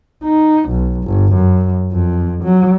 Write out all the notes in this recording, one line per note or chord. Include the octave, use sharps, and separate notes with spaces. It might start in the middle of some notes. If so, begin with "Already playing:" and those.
D#4
B1
G1
F#2
F2
F#3